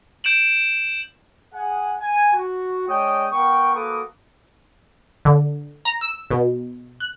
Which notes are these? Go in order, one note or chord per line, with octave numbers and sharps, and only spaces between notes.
G6 D7 E7 F#7
G#4 F#5 G#5
G#5
F#4
G#3 D4 C#5 G5 D#6
B3 A#4 G5 C#6
A#3 F#4 A4 B4 D6 D#6
D3
A#5
E6
B2
F#6